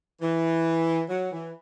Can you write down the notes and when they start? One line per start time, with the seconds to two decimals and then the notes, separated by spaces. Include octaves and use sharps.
0.22 E3
1.09 F#3
1.32 E3